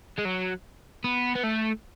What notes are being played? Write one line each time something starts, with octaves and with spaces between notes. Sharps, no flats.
G#3
F#3
B3
B3
A3